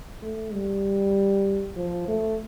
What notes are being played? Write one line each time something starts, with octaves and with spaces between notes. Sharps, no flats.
A3
G3
F3
A3